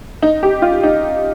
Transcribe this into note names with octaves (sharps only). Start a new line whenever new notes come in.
D#4
G4
F4
D#4